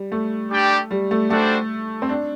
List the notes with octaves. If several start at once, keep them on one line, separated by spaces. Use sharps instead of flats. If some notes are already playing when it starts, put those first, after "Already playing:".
Already playing: G3
A3
G3 D4 G4 D5 G5
G3
A3
G3 A3 D4 F#4 A4 C5
C4
D4